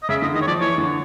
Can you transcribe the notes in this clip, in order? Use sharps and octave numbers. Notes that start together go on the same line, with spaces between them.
D#5
C#3 E5
D3 D#5
D#3 D#5
C#5
F3 D5
E3 C#5
D3